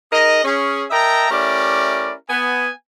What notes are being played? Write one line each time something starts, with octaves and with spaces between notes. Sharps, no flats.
D#4 G#4 A#4 D#5
C#4 G#4
A#4 D#5 E5 G5 A5 A#5
A3 C#4 E4 G4 A#4 D5
B3 G#5